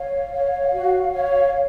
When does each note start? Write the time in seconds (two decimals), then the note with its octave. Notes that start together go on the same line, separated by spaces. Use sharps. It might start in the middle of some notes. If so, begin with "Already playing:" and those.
Already playing: C#5 F5
0.32 C#5
0.73 F#4
1.13 C#5